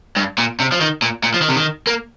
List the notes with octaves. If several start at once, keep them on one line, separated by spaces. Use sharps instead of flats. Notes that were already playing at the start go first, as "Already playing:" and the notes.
G2
A#2
C3
F3
D#3
A#2
A#2
F3
D#3
C3
D#3
A#3